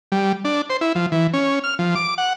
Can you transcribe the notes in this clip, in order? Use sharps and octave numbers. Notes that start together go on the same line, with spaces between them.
G3
D4
C5
E4
F3
E3
C#4
F6
F3
D6
F#5